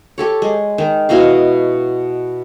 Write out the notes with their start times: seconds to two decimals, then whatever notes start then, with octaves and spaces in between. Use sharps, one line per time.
0.18 G4 A4 C#5
0.42 G#3
0.78 D#3
1.09 B2 E4 D#5 F5